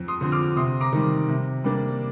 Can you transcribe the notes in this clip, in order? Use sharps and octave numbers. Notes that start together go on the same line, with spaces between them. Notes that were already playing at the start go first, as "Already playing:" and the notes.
Already playing: F2
C6 D#6
D3 F3 C4
D6 F6
C3 C6 D#6
A#5 D6
D#3 G3
C3
G3 A#3 D4